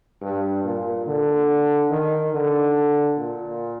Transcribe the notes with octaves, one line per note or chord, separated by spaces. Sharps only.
G2
A#2
D3
D#3
D3
A#2